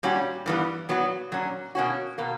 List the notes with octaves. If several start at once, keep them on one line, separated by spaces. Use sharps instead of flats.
A#2 G3 C#4 F#4
G2 E3 G3 B3
A#2 F#3 B3 F#4
A#2 F#3 C#4
B2 A#3 C#4 F#4
B2 A#3